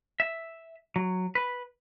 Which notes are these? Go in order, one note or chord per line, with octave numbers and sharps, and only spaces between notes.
E5
F#3
B4